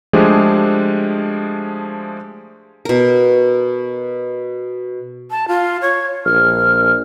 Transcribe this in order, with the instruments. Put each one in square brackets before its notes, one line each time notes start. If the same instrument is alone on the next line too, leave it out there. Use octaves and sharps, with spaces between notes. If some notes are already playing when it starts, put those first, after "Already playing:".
[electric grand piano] F3 G#3 A3 D4 G4 G#4
[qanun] B2 A#4
[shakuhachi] A5
F4
C#5
[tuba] A#1 [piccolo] F6